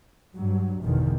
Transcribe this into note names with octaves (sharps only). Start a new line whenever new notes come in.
G2 F#3
G1 E2 B2 D3 D#3